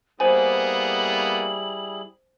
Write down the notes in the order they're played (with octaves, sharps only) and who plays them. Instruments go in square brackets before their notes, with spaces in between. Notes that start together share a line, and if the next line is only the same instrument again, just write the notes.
[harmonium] G3 E4 G#4 [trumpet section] A#3 B3 [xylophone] C5 G#5 [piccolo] F#7